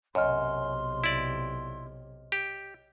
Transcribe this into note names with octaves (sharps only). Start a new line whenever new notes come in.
B1 F#2 C3 C#5 D#5 C6 F6
E4 D5
G4